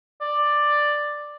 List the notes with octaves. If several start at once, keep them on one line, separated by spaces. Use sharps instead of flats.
D5